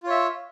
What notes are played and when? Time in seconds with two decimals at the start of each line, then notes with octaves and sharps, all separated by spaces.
0.03 F4
0.07 C#5
0.10 E5